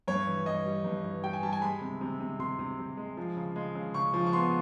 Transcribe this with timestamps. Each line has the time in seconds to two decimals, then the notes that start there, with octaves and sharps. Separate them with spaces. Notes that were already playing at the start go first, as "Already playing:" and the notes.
0.08 G2 C#5
0.27 E3
0.46 G2 D#5
0.65 G3
0.85 G2
1.04 E3
1.24 G3 G5
1.33 G#5
1.43 G3 A5
1.53 G#5
1.62 G#3 B5
1.81 C3
2.01 C3
2.20 C3
2.39 C3 C6
2.59 C3
2.78 C3
2.97 G#3
3.17 F3
3.37 C#3
3.56 G#3
3.75 C#3
3.94 C#3 C#6
4.14 F3
4.26 C#6
4.33 B3 C6